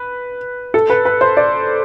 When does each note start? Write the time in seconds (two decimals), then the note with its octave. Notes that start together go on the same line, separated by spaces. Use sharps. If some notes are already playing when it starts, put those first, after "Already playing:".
Already playing: B4
0.74 A4
0.90 B4
1.05 B4
1.21 C5
1.37 D5